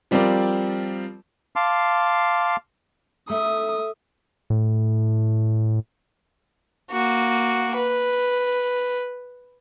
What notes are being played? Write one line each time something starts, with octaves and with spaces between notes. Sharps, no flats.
F3 G3 C4 F4 A#4 D5
F5 A5 C6 D6
A3 E5 D#6
A2
A#3 F#4
B4